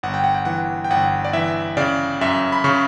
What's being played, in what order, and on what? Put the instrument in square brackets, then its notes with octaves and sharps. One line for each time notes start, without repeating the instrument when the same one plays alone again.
[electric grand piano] G1 F#5
G5
F#5
G5
E3 F#5
G5
G1 F#5
D5
E3 E5
C#3 D5
F#2 E5
B5
C#3 C#6